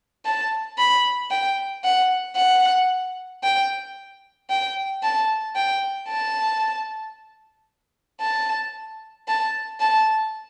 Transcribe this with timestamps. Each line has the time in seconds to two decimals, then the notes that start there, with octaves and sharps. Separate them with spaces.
0.25 A5
0.78 B5
1.31 G5
1.84 F#5
2.37 F#5
3.44 G5
4.50 G5
5.03 A5
5.56 G5
6.09 A5
8.21 A5
9.28 A5
9.80 A5